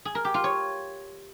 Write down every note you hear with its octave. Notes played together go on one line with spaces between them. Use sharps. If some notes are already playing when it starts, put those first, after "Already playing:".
G#4
A#4
G4
F4
C#5